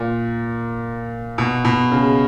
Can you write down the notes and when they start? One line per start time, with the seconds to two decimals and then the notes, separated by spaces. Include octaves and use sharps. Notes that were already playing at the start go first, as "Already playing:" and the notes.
Already playing: A#2
1.38 B2
1.65 B2
1.92 C#3